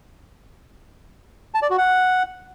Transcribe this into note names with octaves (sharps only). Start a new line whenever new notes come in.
A5
D5
F#4
F#5